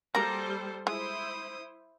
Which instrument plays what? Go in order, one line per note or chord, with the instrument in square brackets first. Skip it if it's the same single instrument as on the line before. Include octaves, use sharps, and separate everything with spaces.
[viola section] G3 C5 [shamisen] A#3 F#4 A#4 [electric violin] A4 [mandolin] A#5
[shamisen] G#3 [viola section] E4 C5 [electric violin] D#6